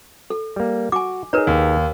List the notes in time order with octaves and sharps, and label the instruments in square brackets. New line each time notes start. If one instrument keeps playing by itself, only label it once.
[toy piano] A4
[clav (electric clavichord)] G3 A#3
[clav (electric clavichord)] F#4 [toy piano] G#5 D6
[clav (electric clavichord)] D#4 G#4 [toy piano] A#4 B4 C#5
[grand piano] D#2